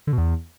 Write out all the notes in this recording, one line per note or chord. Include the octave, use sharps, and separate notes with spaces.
D3
B2
E2